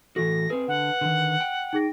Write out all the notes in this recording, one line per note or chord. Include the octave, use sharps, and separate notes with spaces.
A2 E3 F#4 A4 A#6
C4 G#4 B4
D3 F#5
D3 D#3
G5
D#4 G#4 A#6